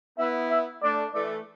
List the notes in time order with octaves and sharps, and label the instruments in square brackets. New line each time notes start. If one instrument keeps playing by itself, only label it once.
[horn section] B3 E4 [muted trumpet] E5
[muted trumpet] E5
[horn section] A3 D4 [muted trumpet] D5
[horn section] E3 A3 [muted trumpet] D5